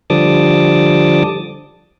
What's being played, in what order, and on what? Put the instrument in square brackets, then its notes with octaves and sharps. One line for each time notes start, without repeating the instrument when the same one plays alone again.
[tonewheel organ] D3 F3 G3 A5 D6 D#6